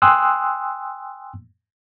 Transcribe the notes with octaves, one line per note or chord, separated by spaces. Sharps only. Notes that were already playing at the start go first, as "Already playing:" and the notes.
G5 G#5 C6 D#6 E6 F#6